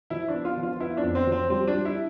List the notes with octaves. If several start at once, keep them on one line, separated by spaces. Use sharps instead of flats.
F3 E4
D4
B3
F4
F3
F4
B3 E4
D4
F2
C4
F3
C4
G3 C4
D4
G3
E4